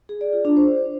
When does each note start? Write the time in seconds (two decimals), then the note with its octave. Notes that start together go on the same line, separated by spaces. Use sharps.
0.09 G#4
0.21 D5
0.33 F4
0.45 D4
0.57 C5